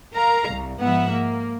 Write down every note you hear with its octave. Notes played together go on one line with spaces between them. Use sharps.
A#4 F5 A#5
C2
G#2 F3 B3 E5 F#5
A#3